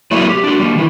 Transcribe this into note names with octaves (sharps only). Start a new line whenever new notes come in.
F#3 A3 A#3 E4 B4 D5
G4
D4 F#4
G3 A#3
D#3 E3